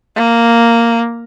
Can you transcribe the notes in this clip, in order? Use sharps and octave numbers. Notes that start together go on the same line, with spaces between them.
A#3